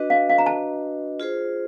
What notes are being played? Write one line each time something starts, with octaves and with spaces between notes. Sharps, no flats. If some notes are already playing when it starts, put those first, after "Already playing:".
Already playing: D4 F#4 B4 D#5
F5
F5
A#5
A5
F4 G#4 C5